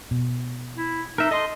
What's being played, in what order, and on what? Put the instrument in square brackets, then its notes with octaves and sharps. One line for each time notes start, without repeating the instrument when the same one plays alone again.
[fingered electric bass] B2
[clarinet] E4
[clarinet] D#4 [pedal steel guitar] A#4 E5
[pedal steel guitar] A4 C6 [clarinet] D#5